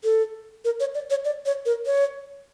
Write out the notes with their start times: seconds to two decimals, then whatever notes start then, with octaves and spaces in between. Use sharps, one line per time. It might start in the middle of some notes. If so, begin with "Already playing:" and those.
0.04 A4
0.65 A#4
0.80 C#5
0.95 D5
1.10 C#5
1.25 D5
1.46 C#5
1.66 A#4
1.86 C#5